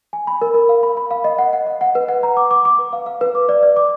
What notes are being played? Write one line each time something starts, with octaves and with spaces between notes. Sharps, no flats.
G#5
B5
A#4
A#4
F5
B5
B5
F5
D#5
F#5
F#5
D#5
F#5
B4
F#5
A#5
D6
D6
D6
B4
F5
F5
B4
D6
D5
D5
D6